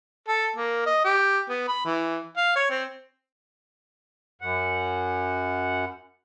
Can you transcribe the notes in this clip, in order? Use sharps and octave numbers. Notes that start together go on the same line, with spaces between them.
A4
A#3
D#5
G4
B3
B5
E3
F5
C#5
C4
F#2 F#5